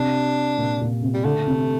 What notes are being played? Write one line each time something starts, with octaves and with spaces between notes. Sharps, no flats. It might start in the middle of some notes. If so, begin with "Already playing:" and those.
Already playing: C3 D4
A#2
A#2
C3
G3
D3 A3
C3